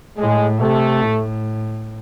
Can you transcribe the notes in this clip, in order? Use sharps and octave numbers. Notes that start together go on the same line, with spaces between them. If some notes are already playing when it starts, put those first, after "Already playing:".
A2 G#3
C3 A3
A2